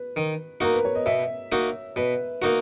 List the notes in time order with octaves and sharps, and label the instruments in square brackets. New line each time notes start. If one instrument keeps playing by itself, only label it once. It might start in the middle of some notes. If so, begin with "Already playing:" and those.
Already playing: [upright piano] B4
[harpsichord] D#3
[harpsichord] A#3 D#4 F#4 [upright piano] A#4
[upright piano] B4
C#5
D#5
[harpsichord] B2 [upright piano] E5
[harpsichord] A#3 D#4 F#4
[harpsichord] B2 [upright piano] B4
[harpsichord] A#3 D#4 F#4 [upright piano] A#4